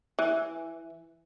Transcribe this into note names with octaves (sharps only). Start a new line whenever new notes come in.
E3